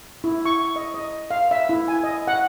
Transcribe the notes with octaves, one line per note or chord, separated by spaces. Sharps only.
E4
C#6
D#5
D#5
F5
E5
E4
G#5
D#5
F#5